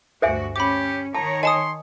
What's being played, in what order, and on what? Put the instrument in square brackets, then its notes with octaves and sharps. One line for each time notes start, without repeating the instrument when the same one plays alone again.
[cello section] D2 G2 F#4 [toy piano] C5 E5 G#5
[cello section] C#4 [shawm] G4 [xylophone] B5 D6
[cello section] D#3 C#5 [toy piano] A5 [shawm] A#5
[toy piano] D#5 [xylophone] G#5 A5 D#6 [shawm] C6